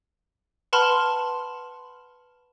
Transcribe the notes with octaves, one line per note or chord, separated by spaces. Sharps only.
B4 F#5 A5 B5 C6 F6